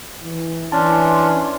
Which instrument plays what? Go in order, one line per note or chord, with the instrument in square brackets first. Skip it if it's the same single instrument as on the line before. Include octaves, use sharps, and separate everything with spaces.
[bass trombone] E3
[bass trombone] E3 [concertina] C#4 D4 [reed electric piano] A5 [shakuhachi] C6